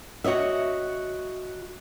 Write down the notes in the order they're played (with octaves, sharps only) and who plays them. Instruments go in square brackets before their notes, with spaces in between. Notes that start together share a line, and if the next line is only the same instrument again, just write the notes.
[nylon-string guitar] F#4 C#5 D#5 E5